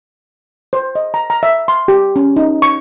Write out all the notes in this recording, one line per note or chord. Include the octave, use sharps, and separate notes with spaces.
C5
D#5
A#5
A#5
E5
C6
G4
C#4
D#4
C#6